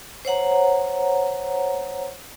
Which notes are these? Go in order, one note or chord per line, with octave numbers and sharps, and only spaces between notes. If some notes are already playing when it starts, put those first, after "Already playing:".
C5 C#5 F#5 A#5